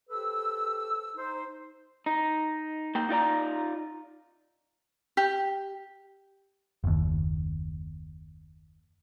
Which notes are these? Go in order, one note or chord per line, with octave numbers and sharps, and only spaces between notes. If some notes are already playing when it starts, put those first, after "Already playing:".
G4 A4 B4 C5 E6
D#4 C5
D#4
A#3 G5
D#4 F4 D5 A#5
G4
F#1 D#2